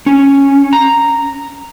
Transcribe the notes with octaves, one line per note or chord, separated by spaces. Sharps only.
C#4
A#5